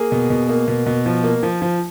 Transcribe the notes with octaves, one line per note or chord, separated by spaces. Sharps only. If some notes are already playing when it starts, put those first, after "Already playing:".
Already playing: A#3 G#4
B2
B2
A#3
B2
B2
F3
A#3
F3
F3